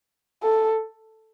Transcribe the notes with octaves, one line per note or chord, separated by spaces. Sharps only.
A4